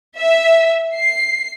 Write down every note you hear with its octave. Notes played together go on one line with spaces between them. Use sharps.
E5
C7